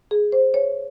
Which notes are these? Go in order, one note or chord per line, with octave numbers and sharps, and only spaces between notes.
G#4
C5
C#5